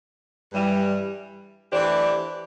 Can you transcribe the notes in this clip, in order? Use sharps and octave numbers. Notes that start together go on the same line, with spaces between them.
G2 E3 G3
E3 A3 D4 G4 C5